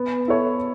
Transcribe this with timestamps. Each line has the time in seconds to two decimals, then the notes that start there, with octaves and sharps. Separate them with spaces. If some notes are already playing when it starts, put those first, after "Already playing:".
Already playing: B3
0.28 E4 A4 C#5